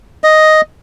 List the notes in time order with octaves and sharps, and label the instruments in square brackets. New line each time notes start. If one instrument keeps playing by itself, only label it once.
[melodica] D#5